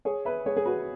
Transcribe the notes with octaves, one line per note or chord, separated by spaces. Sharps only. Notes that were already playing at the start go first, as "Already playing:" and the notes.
G#4 C#5
B4 E5
G#4 C#5
G#4
F#4 B4